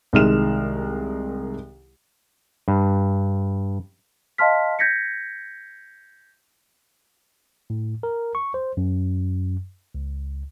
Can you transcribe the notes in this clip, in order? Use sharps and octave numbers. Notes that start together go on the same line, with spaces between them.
C2 D#3 G#3 F6 E7
G2
D#5 F5 A5 C6 F6 B6
G6 G#6 A#6 B6 C#7
A2
A#4
C#6
C5
F#2
C#2